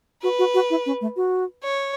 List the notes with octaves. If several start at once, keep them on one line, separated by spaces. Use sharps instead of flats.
F#4 B4
F#4
F#4
E4
C#4
A3
F#4
C#5